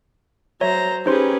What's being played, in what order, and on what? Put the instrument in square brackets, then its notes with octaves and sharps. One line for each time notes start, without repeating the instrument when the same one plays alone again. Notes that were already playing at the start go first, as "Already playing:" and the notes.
[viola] F#3 [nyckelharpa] C5 A#5 [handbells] C#5 E5
[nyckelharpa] C#4 B4 [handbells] D#4 C5 C6 [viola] G4 G#4